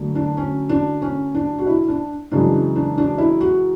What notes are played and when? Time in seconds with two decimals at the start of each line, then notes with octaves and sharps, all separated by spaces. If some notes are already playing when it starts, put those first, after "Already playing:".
Already playing: F#2 D3 A3
0.15 D4
0.37 C#4
0.69 D4
1.02 C#4
1.34 D4
1.58 F#4
1.67 E4
1.88 D4
2.32 F#2 C#3 E3 G#3 D4
2.76 D4
2.98 D4
3.18 E4
3.40 F#4